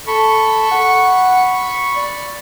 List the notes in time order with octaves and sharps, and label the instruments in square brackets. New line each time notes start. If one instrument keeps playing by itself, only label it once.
[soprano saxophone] A4 [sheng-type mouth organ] B5 C#6
[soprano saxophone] F#5
D5